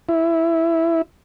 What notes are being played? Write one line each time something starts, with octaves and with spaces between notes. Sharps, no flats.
E4